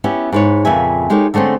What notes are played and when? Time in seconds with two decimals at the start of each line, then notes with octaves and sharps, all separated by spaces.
0.04 B3 C#4 E4 G4
0.32 G#2 B4 C#5
0.65 F2 A#2 C#3 B4 E5 G#5
1.10 G#3 D#4 G4 A4 A#4 C#5
1.34 D3 G#3 A3 C4 C#4